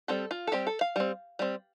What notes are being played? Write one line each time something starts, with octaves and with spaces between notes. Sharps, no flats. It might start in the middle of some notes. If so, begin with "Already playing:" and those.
G3 C4 A4
F4
A4
G3 C4 G4
A4
F5
G3 C4
G3 C4